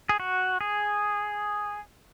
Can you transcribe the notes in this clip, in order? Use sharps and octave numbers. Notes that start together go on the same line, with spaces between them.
G#4
F#4
G#4